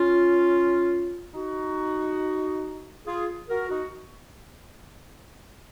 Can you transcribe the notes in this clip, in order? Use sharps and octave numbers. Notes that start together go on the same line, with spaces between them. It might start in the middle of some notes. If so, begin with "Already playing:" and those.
Already playing: C#4 F4
D#4 F#4
F4 G#4
F#4 A#4
D#4 F#4